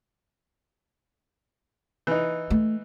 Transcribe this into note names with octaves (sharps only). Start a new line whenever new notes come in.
E3 D#4
A3